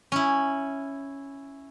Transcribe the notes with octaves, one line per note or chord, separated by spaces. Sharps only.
C#4 E4